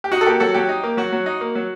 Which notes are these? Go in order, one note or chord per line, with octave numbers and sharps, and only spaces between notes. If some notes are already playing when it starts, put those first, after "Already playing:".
G4
D#4 F#4
A4
A#3 G4
F#3 F#4 A4
F#3 G4
D#4
A#3
F#3 F#4
F#3
D#4
A#3
F#3